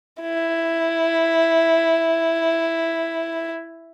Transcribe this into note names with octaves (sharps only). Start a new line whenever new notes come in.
E4